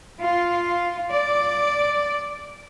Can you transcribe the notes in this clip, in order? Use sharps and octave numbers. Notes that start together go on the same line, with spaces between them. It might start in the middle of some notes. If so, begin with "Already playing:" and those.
F4
D5